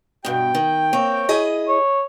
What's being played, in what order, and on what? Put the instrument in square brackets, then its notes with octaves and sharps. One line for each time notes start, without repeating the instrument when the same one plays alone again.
[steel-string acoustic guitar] G2 B2 [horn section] G5
[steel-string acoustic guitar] D#3
[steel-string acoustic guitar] A#3 C4 [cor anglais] C#5
[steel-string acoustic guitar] E4 G#4 D#5
[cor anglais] C#5